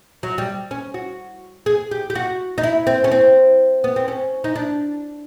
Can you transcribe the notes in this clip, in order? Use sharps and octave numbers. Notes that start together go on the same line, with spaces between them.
F#3
G3
C#4
F#4
G#4
G4
G4
F#4
D#4
E4
C4
C#4
C4
B3
C4
C#4
D#4
D4